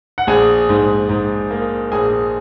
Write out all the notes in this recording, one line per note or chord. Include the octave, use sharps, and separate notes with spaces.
F#5
A#1 G#4 G#5
G#2
G#2
A#3
A#1 G#4 G#5